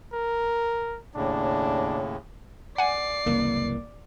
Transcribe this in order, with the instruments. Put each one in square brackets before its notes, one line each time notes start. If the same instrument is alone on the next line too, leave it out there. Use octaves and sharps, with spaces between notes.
[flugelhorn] A#4
[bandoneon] D#2 A2 C#3 [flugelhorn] D4
[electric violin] D5 C7 [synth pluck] F#5 G#5
[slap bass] F#1 C2 E3 [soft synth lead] A#3